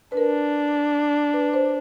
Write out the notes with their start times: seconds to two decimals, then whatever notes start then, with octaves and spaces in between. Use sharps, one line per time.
0.12 B4
0.17 D4 A#4
1.34 B4
1.54 C5